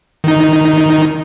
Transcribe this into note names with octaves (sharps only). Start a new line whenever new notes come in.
D#3 D#4